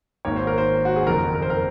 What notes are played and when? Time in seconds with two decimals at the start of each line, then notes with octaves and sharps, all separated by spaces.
0.25 G#1 G#2 D#3 A#3 C#5
0.36 C5
0.47 A#4
0.58 C5
0.85 F#4
0.96 G#4
1.07 F#1 F2 D#3 A#4
1.34 A#4
1.42 C5
1.50 A#4